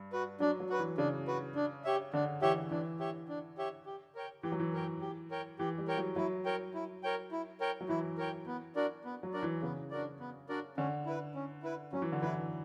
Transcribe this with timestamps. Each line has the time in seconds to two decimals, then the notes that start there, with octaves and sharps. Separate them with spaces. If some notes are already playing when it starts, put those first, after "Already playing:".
Already playing: G2
0.12 F#4 B4
0.40 F#3 D4
0.60 F#3
0.70 F#4 B4
0.79 E3
0.98 C#3 D4
1.27 F#4 B4
1.55 D4
1.85 G4 C#5 E5
2.13 D3 D4
2.42 E3 G4 C#5 E5
2.71 E3 D4
2.99 G4 C#5 E5
3.29 D4
3.58 G4 C#5 E5
3.86 G4
4.15 A#4 C#5 G5
4.43 E3 G4
4.52 F#3
4.60 E3
4.73 A#4 C#5 G5
5.01 G4
5.31 A#4 C#5 G5
5.59 E3 G4
5.78 G3
5.88 A#4 C#5 G5
5.97 F#3
6.16 F#3 E4
6.45 A#4 C#5 G5
6.74 E4
7.03 A#4 C#5 G5
7.32 E4
7.60 A#4 C#5 G5
7.81 F#3
7.89 E3 E4
8.18 A#4 C#5 G5
8.47 B3
8.76 D4 F#4 A#4 D5
9.05 B3
9.23 F#3
9.33 D4 F#4 A#4 D5
9.43 E3
9.62 C#3 B3
9.91 D4 F#4 A#4 D5
10.20 B3
10.49 D4 F#4 A#4 D5
10.77 D3 C#4
11.06 E4 B4
11.35 C#4
11.63 E4 B4
11.93 F#3 C#4
12.02 E3
12.12 D3
12.21 E3 E4 B4